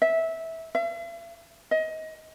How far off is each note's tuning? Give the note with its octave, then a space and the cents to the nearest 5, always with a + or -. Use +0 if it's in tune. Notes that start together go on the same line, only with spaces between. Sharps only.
E5 -15
E5 +45
D#5 +25